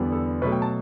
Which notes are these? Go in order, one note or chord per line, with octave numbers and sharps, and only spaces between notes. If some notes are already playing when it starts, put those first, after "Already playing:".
Already playing: E2 D3 G3 B3
A4
B2 F#3 A3 B4
G5
A5